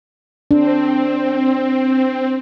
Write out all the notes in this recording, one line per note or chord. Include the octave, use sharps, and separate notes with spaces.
C4 D4